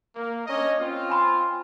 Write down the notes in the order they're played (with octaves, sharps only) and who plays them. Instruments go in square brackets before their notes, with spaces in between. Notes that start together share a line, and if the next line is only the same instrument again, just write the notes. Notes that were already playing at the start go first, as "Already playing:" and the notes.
[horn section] A#3
C#4 D4 D#5
C4 F4
[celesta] G#5 B5 C6